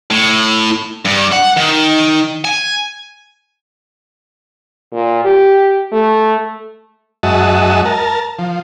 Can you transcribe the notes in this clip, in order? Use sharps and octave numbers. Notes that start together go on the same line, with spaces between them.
A2
G2
F#5
D#3
G#5
A#2
G4
A3
F#2 G#3 F#4 D#5 E5 A5
A#4 A5
F3